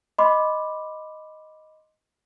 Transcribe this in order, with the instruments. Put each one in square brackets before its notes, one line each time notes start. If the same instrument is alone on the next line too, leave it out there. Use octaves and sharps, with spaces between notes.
[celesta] D#5 B5 C6 D6